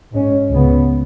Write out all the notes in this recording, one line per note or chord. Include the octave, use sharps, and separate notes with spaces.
G#2 G#3 C#4
C#2 C#3 B3